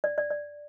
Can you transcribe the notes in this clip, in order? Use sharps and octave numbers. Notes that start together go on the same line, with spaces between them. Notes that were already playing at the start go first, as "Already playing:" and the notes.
D5
D5
D5